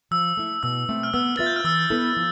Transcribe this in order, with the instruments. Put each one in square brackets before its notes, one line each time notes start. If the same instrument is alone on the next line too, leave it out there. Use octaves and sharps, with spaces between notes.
[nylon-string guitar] F3 [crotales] E6
[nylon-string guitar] A3 E4
[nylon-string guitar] B2 [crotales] E6
[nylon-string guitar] A3 C4
[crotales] F6
[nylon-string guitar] B3 [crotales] E6
[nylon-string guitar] F4 B4 E5 [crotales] A6
[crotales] G6
F6
[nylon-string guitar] E3 [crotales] E6
[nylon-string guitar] B3 E4 A4
F3